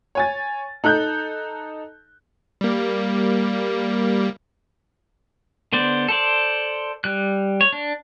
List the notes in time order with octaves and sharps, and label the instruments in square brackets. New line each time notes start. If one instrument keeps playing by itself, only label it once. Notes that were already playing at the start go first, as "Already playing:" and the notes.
[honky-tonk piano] C#5 G#5 A6
D#4 A4 F#6 G6
[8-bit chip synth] G3 A#3
[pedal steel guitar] D3 B3 C5 D5
A4 C5 D5
G3 F#6
C#5
D4